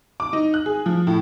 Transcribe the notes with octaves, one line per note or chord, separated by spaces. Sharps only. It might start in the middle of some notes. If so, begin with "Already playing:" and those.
D6
D#4
F#6
G#4
F3
A2